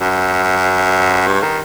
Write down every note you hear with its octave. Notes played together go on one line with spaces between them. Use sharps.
F#2
G2
D#3